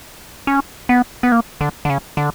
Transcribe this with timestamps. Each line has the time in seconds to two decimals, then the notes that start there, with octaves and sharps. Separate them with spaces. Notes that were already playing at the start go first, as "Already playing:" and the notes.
0.47 C#4
0.89 B3
1.23 B3
1.32 A#3
1.61 D3
1.85 D3
1.90 C#3
2.17 D3